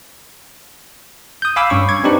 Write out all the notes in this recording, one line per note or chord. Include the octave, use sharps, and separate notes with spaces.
D#6 G6
F5 G#5 B5 D6 E6
G2 C#4 C#6
C#6 D6 G#6
C4 D4 D#4 G4 B4